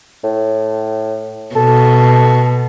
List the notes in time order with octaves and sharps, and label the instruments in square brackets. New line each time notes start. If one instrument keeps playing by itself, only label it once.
[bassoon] A2
[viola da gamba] B2 [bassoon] A4